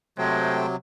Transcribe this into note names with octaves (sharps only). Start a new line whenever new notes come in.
C3 F#3 G#3 A3 C5 G5